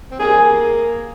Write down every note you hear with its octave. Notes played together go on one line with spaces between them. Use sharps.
C4
D#3 G3 A#3 G#4